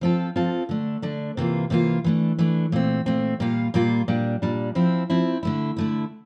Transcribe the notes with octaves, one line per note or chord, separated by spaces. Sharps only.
F3 C4 F4 A4
F3 C4 F4 A4
D3 A3 D4
D3 A3 D4
C3 E3 A#3 F4
C3 E3 A#3 F4
E3 A3 D4
E3 A3 D4
A#2 A3 C4
A#2 A3 C4
A#2 G3 A#3 F4
A#2 G3 A#3 F4
A#2 G3 D4
A#2 G3 D4
F3 C4 E4
F3 C4 E4
D3 A3 E4
D3 A3 E4